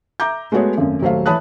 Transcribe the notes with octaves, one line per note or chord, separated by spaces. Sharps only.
E5 A#5 D6 G6
G#3 A3 B3 F#4 G#4 C#5
G#1 F#2 A3
D#1 F#3 A3 C5 F5
E3 C#5 A5 B5 D#6 F#6